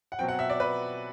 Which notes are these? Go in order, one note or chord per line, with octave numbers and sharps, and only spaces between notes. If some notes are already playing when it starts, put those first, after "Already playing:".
F#5
B2 F#3 C4 G5
F#5
E5
D5
B4